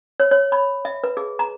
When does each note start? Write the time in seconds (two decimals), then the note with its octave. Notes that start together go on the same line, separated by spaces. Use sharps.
0.20 C#5
0.31 C#5
0.52 B5
0.85 E5
1.04 B4
1.17 G#4
1.39 A#5